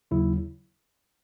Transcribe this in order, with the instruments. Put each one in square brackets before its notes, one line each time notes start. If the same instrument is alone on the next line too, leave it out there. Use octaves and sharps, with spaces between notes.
[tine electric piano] D#2 C#3 F#3 E4